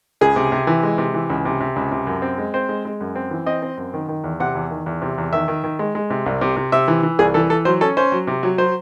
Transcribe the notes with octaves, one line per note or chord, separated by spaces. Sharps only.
C#2 G#4
C3
C3
E3
G#3
C3
E3
C#2
C3
C3
C#2
C3
F#2
C4
G#3
C4 C5
G#3
G#3
F#2
C4
E3
C4 D#5
C4
F#2
D#3
D#3
E2
C3 F#5
E2
D#3
E2
C3
E2
D#3 E5
D#3
D#3
G#3
G#3
C3
C2
C3
C3
C3 E5
E3
E3
C2 G#4
E3 A4
E3 A4
F#3 C5
C#4 A4
C#4 C5
F#3
C3
F#3
F#3 C5